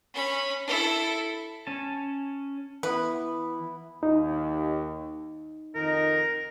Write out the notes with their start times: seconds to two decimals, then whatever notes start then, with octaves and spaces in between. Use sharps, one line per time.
0.14 C#4 B5
0.67 E4 A4
1.67 C#4 A5
2.83 E3 B3 E4 B4
4.03 D#2 D#4
5.75 F2 D#3 D#4 A#4